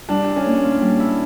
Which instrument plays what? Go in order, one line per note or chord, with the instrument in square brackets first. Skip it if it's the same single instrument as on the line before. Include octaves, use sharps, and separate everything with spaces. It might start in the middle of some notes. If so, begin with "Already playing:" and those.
[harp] G3 [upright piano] D4
[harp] E4
[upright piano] C#4
[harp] A#3
A#2
G3
E4